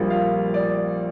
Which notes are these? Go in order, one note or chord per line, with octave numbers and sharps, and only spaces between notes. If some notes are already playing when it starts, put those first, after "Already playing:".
Already playing: A#1 A#2 G3 A#3
F5
D5